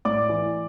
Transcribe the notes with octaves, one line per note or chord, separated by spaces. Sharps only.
A2 D5 D6
E3